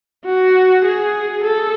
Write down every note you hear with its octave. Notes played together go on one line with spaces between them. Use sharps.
F#4
G#4
A4